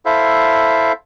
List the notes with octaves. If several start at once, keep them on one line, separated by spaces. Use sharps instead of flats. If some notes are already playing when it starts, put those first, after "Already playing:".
E4 A4 C5 E5 F5